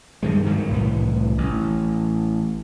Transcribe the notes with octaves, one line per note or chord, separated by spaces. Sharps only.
G2 D#3 G#3
G#2 D#3 F#3
C2 A2 E3
A1